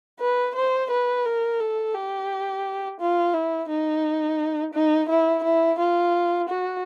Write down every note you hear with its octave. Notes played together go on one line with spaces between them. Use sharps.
B4
C5
B4
A#4
A4
G4
F4
E4
D#4
D#4
E4
E4
F4
F#4